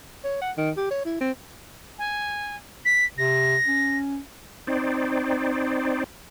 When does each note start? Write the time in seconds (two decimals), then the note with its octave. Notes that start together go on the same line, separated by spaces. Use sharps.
0.24 C#5
0.41 F#5
0.57 D#3
0.77 G4
0.90 C#5
1.05 E4
1.21 C4
1.98 G#5
2.85 B6
3.18 C3 A#6
3.67 C#4
4.67 C4 D#4 C5 D5